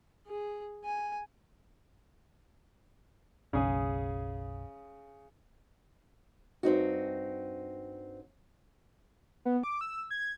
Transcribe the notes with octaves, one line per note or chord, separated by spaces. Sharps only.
G#4
G#5
F#1 B1 C#3 G#4
G2 C4 D#4 F#4
B3
D6
E6
G#6